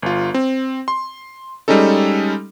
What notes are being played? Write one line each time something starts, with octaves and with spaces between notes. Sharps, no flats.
G1 F4
C4
C6
G3 G#3 C#4 D#4 A4